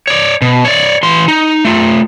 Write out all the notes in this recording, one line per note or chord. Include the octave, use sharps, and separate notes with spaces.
C#5 D5
B2
C#5 D5
E3 C6
D#4
A3 F4